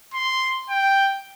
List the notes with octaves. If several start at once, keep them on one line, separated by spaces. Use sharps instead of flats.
C6
G5